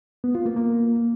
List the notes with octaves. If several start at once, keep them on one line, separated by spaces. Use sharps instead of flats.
B3
F4
A#3
A#3